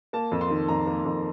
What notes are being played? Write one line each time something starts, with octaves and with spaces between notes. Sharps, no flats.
A#3 A5
F2
C6
D#3
F2 A#5
A#3
F2